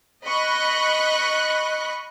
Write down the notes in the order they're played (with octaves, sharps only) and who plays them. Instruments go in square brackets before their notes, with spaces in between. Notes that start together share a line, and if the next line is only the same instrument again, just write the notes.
[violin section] D#5 B5 C#6 F#6